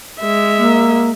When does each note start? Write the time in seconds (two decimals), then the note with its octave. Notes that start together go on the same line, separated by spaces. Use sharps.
0.20 G#3 E5
0.57 A#3